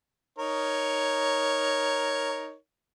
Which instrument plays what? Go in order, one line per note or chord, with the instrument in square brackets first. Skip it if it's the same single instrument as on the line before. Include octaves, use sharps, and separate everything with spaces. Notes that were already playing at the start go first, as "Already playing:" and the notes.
[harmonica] D#4 A#4 C#5